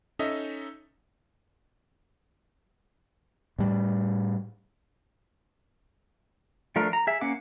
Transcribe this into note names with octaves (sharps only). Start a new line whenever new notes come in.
C#4 D#4 A4 D#5 E5
A2 G3
F3 A3 D4 A#4
A#5
G#4 E5
A#3 C#4 F#5 D6